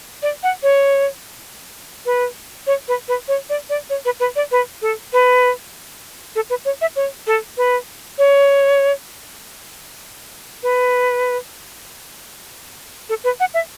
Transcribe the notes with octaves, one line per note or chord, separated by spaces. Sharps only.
D5
F#5
C#5
B4
C#5
B4
B4
C#5
D5
D5
C#5
B4
B4
D5
B4
A4
B4
A4
B4
C#5
E5
C#5
A4
B4
C#5
B4
A4
B4
F#5
E5